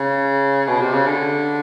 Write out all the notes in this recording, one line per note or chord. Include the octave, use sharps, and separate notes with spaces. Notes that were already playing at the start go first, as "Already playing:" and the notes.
Already playing: C#3
B2
C3
C#3
D3